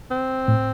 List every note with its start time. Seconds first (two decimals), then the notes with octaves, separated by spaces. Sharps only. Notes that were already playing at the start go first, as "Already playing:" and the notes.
0.11 C4
0.48 A2